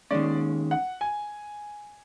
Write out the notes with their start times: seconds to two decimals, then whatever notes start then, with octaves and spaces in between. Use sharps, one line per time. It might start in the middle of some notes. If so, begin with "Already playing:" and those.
0.11 D#2 D#3 G#3 C#4 D5
0.71 F#5
1.01 G#5